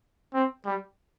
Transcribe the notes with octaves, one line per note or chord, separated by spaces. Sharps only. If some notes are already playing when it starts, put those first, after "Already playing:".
C4
G3